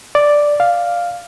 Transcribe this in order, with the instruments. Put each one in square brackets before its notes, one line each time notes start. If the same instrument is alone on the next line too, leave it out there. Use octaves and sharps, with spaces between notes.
[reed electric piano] D5
F5